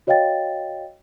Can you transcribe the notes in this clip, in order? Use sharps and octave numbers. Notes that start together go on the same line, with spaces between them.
F#4 C#5 D#5 F5 G5 A6